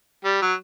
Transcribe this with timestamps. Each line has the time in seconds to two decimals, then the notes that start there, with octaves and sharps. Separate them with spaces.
0.25 G3
0.42 F#3